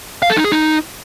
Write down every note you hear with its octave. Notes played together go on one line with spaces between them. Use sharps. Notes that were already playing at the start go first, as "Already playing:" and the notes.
F5
A4
D#4
G#4
D#4